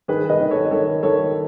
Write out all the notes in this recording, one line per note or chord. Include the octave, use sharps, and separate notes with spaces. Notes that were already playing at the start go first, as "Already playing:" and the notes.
D#3 G#4 B4
B4 D#5
D#3
A4 C#5
D#3 A4 C#5
D#3 A4 C#5